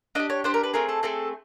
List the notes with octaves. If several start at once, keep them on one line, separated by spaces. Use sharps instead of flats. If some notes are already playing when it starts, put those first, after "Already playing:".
D4 G4 D#5
C#5
D4 G4 C5
A#4
B4
A3 C4 G#4 A#4
A4
A3 C4 G#4 A4